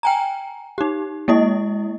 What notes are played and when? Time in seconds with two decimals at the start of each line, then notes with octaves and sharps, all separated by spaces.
0.03 G5 G#5 A#5
0.78 D#4 G4
1.28 G#3 A#3 E4 D#5